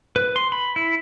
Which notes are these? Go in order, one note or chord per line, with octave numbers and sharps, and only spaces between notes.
B4
C6
B5
E4